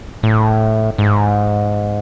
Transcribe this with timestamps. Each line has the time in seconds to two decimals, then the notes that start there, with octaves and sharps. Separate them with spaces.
0.23 A2
0.98 G#2